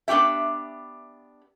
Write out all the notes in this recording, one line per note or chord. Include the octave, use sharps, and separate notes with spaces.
B3 D4 F#4 G4 E5